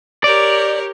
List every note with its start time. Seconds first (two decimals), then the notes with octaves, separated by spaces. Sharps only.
0.24 G4 A#4 C#5 D5